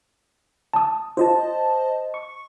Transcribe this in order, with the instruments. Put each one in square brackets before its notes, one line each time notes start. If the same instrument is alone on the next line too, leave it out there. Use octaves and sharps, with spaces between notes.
[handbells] A5 D#6
[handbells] F4 [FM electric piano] C5 D#5 A5
[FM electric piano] C#6